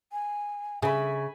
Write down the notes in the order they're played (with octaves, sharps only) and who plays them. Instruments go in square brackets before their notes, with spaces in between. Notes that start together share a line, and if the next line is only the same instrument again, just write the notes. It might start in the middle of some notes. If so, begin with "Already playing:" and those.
[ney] G#5
[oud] C#3 [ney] E5 [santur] G#5 B5